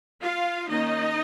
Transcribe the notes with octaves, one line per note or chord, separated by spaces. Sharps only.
F4 F5
D#3 A#3 C#4 D#4 D#5